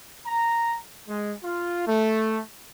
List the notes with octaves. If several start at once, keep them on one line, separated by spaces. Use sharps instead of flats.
A#5
G#3
F4
A3